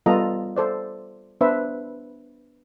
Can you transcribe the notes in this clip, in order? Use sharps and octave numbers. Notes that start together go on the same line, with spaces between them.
G3 B3 F4 A4 D#5 A#5
A4 C5 D5
B3 D4 B4 C5 E5